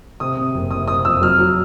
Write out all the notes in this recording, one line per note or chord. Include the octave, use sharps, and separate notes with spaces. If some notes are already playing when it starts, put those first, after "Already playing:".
C3 D#6
C3
F#1
C3 D#6
C3 D#6
F2 E6
F#3 F6
F#3